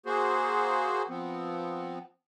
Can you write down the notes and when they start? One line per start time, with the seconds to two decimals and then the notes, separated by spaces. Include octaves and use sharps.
0.06 A#3 F#4 G#4 C5
1.08 F3 B3 C4